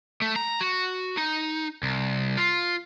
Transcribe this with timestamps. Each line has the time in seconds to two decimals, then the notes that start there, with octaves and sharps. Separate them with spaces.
0.22 A3
0.36 A#5
0.61 F#4
1.17 D#4
1.83 C2
2.37 F4